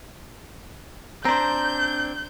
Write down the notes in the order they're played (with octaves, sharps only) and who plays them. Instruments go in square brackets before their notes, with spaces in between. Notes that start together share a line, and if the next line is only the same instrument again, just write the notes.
[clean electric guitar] C4 D4 [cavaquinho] C5 A#5 [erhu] G6